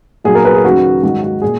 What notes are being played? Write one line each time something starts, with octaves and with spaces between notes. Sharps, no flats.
B1 A#2 F#3 G#4
A#4
B4
G#4
D#2 C#3 F#3 F#4
G#1 G#2 D#3 F#3 F#4
F#4
A#2 G#4